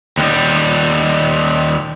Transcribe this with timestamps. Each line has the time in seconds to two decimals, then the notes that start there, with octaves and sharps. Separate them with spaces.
0.17 D#2 G3